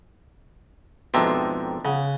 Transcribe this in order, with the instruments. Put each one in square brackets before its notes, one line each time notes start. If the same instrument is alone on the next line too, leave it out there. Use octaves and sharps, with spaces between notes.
[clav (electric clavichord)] F2 G#2 B2 [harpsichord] D4 E5 C6 [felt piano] G5 A#5
[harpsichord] C#3 [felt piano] F#5